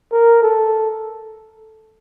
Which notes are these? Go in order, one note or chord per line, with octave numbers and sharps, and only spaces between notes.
A#4
A4